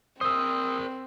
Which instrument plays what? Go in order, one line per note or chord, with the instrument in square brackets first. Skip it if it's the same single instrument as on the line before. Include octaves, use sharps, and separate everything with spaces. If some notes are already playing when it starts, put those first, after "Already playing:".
[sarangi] C4 [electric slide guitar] A#4 C5 [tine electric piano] D#6 E6